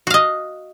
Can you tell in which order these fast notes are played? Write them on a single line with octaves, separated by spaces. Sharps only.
F#4 F5 D#5